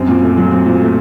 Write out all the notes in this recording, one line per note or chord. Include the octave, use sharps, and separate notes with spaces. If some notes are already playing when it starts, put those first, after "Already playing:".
Already playing: F#2 C4
A#2
A3
F#3
C4
A#2
A3